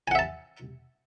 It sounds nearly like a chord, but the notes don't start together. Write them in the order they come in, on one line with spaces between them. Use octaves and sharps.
G#5 F#5 E5 A5